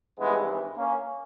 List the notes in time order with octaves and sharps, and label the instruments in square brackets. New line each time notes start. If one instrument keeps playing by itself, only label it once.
[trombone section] G#1 G2 E3 G#3 B3
A#3 C#4